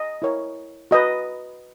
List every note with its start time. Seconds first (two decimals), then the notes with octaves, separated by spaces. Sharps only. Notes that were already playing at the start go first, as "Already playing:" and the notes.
Already playing: D#5
0.22 E4 A#4 C#5
0.91 F#4 B4 D#5